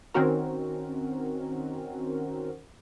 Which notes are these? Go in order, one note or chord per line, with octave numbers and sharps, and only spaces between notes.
D#3 C4 C#4 F#4 A#4